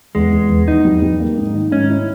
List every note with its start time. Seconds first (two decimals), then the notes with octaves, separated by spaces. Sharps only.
0.15 E2 G#3
0.32 E2
0.49 E2
0.68 E2 D#4
0.85 G3
1.02 G3
1.20 A#3
1.38 G#2
1.54 D#3
1.72 G#2 C#4
1.89 E4